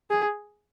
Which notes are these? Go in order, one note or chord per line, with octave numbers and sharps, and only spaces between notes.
G#4